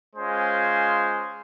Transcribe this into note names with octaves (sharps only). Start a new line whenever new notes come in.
G#3 C#4 F4 C5 G#5